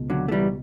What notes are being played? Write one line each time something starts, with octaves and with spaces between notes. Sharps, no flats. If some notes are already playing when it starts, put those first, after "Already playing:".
Already playing: C#2 B2
D3 F#3
A3
E3 G3